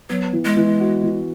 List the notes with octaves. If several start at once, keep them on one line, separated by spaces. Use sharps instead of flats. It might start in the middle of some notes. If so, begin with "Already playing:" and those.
F#3 B3
E3
G#3
E3
F#4
E3